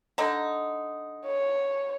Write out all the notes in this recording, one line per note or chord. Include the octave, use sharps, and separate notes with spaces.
D3 D#4
C#5